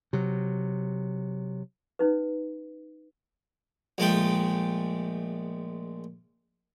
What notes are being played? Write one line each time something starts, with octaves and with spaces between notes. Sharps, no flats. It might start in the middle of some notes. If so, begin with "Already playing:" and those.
C3 F#3
C#4 D#4 B4
A#1 G#3 A3 G5